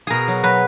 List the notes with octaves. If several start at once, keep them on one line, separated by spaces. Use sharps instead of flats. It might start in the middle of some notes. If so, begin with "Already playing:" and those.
B2 G#4 A#4
F#3
F#3 B4